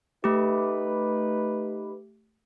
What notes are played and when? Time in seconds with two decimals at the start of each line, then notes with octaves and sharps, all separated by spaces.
0.24 A3 D#4 G4 B4